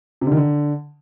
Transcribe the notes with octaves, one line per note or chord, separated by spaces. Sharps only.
C3
D3
D#3
D3